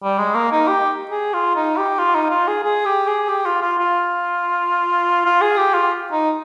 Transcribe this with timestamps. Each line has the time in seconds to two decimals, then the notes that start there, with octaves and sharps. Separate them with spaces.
0.03 G3
0.18 G#3
0.34 A#3
0.51 D#4
0.68 G4
1.11 G#4
1.33 F4
1.55 D#4
1.77 G4
1.99 F4
2.15 D#4
2.30 F4
2.47 G#4
2.63 G#4
2.85 G4
3.07 G#4
3.28 G4
3.45 F4
3.62 F4
3.78 F4
5.25 F4
5.41 G#4
5.57 G4
5.74 F4
6.12 D#4